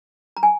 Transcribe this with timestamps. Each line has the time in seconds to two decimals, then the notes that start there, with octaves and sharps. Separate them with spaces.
0.37 A#5
0.43 G#5